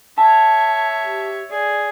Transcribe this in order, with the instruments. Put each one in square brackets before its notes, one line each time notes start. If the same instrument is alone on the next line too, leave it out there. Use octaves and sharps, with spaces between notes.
[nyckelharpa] C#5 E5 [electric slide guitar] A5
[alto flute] G4
[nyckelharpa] G#4 [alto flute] D5